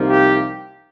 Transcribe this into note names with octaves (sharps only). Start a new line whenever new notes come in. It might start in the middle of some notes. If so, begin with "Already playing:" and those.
Already playing: C2 C3 F3 A#3 D#4
G4